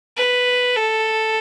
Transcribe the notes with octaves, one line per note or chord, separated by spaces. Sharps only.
B4
A4